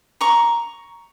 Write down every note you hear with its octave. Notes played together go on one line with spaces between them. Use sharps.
A#5 C#6